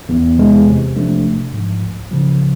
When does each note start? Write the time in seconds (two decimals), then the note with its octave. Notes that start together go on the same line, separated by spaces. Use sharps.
0.09 E2
0.38 C3 E3 G#3
0.66 C3
0.96 F3 A3 D4
1.24 A1
1.53 G#2 F3
1.82 C#2
2.11 C#3 F3